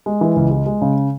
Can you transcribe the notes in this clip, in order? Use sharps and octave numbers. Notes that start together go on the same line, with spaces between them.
G#3
E3
C#2
G#3
G#3
C#3